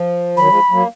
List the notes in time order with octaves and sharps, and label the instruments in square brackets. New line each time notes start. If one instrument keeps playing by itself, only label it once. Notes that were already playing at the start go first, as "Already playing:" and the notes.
Already playing: [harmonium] F3
[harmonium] D#3 F#3 [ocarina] B5
[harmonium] F3 G#3
F#3 A#3